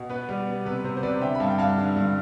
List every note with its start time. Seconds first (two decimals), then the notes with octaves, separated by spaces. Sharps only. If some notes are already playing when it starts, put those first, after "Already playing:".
Already playing: B2
0.09 B3 B4
0.29 G3
0.46 B3
0.65 C3 B4
0.84 C3 C5
0.97 C5
1.03 C3 B4 D5
1.21 D3 E5 G5
1.35 B5
1.40 G2 F5 A5
1.50 G5
1.58 G2 F5 A5
1.78 D3
1.96 G2